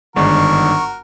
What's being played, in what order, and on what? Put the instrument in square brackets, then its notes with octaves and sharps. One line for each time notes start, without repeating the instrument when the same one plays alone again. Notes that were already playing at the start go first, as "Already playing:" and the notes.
[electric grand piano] G1 G#2 D4 [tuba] D#3 [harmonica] F#4 A#4 [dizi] C#6